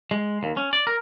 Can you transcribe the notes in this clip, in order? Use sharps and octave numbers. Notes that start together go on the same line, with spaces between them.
G#3
D#2
C#4
D5
A#4